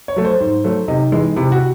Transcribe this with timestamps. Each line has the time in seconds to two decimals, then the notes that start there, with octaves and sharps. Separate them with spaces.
0.08 C#5
0.16 F#3 A3
0.25 C5
0.40 G#2
0.64 F#3 A3
0.88 C3 D#4
1.12 E3 G#3
1.36 C3 E4
1.52 F#4